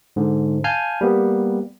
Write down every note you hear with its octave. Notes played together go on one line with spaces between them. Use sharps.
G#2 D3
F5 G#5 A5 F6 G6
G3 A#3 B3